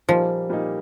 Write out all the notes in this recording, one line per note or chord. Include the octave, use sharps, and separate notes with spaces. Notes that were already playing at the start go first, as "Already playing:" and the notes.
A#2 F3 G3 A#3 D#4
A#2 G3 A#3 D#4